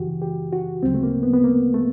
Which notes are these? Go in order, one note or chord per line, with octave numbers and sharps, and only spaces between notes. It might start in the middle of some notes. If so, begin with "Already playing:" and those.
Already playing: F#2 C#3 E3 F#4 G4
G4
F#4
D2 C#3 F#3 C4
A3
A#3
B3
B3
A#3
A3